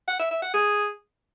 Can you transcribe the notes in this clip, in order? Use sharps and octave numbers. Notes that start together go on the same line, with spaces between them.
F#5
E5
E5
F#5
G#4